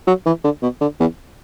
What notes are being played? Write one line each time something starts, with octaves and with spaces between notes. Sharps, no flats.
F#3
E3
D3
B2
D3
E2